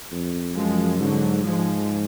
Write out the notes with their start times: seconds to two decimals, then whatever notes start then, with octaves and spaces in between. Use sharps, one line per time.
0.11 F2
0.55 F#2 F3 G#3
1.00 G#2 D3 F#3
1.44 G#2 F3 G#3